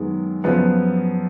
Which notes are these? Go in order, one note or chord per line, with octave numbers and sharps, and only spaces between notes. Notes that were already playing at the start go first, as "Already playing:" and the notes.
Already playing: F#2 D#3 G#3 B3
F#2 C#3 F3 B3